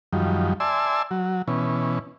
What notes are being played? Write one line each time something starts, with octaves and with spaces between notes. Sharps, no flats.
F#2 D#3 F3 G3
D5 E5 G#5 A5 C6 E6
F#3
B2 E3 C#4